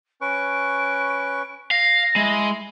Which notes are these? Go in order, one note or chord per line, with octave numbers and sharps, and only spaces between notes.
C#4 B4 C#6 D7
F5 A#6
G#3 E4